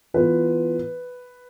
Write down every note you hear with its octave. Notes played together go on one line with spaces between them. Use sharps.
E3 B3 F4 B4